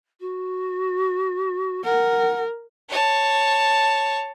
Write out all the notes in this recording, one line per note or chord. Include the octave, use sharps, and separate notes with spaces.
F#4
A#4 F#5
C#5 A5